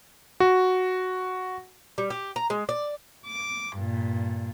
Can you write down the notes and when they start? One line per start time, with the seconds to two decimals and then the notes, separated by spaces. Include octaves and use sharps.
0.40 F#4
1.98 G3
2.10 G4
2.36 A#5
2.50 G#3
2.69 D5
3.26 D6
3.75 G2 A#2